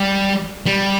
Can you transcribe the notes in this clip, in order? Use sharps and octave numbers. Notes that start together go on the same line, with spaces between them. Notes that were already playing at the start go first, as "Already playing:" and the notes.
Already playing: G3
G3